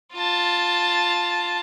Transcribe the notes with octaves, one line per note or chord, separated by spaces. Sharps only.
F4 A5